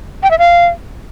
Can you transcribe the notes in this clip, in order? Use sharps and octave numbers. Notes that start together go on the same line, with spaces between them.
G5
E5
F5